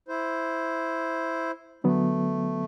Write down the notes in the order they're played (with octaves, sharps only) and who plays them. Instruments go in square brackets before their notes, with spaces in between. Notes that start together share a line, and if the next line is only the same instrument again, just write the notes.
[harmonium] E4 C5
[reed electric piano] D3 F#3 B3 [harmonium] A3